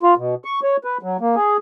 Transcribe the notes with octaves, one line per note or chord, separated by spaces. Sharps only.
F4
B2
C#6
C#5
B4
F#3
A#3
G#4